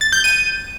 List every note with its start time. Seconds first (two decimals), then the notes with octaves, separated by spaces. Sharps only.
0.01 A6
0.13 G6
0.24 D#7